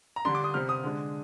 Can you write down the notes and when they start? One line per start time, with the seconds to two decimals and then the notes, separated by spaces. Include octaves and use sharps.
0.16 A#5
0.25 D3 G3 D4 C6
0.35 D6
0.44 D#6
0.54 C3 G3 C4 F6
0.69 D#6
0.83 D3 G#3 D4